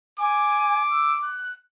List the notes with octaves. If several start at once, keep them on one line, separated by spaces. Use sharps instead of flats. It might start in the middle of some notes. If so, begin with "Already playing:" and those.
G#5 D6
E6
F#6